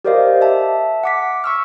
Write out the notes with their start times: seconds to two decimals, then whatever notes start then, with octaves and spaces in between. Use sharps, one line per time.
0.05 G4 A#4 C5 D5 D#5 F5
0.41 E5 A5
1.03 F#5 D6 B6
1.44 C#6 E6 F6